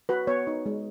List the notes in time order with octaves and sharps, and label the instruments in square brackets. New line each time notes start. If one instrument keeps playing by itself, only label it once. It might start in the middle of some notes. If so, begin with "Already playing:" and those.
[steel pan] F#4 B4
B3 C#5
D#4
G#3